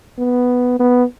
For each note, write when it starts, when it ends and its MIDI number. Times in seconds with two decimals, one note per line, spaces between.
0.18 0.77 59
0.79 1.04 59